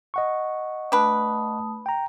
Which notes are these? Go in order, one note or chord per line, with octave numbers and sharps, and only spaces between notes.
D#5 F#5 C#6
A3 D4 B4 A5 D#6
G5 A#5